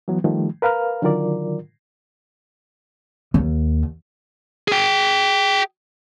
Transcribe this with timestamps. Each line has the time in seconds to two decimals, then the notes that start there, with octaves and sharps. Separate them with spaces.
0.08 E3 F#3 B3
0.24 D#3 F3 G3 A3
0.62 A#4 B4 F5 A#5 F6
1.02 D3 D#3 F#3 F4 A#4 D5
3.34 D#2
4.68 G#4 G5